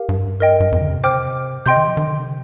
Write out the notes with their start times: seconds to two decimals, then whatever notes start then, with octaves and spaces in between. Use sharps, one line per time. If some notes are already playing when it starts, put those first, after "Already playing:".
Already playing: G4 A#4 F5
0.09 G2
0.40 A#4 D#5 G5
0.60 G2
0.72 F2
0.82 D3
0.88 C3
1.04 C5 G5 D6 F6
1.66 C3 D#5 G5 C6 G6
1.77 D#3
1.87 F3
1.97 D#3
2.08 D3
2.18 C3